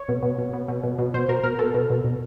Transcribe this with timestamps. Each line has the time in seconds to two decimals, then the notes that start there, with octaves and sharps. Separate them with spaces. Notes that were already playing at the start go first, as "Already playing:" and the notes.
Already playing: C#5
0.09 B2
0.23 B2
0.38 B2
0.53 B2
0.68 B2
0.84 B2
0.98 B2
1.14 B2 C5
1.29 B2 A#4
1.43 B2 A#4
1.59 B2 A4
1.74 B2
1.90 B2
2.04 B2